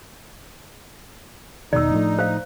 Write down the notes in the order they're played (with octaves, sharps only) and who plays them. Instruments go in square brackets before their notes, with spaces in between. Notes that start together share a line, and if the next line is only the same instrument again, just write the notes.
[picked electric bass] E1 B2 D#3 [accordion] D#4 [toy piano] D5 E6
[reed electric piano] A2 F3 A3 [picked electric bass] D4
[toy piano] C5 F5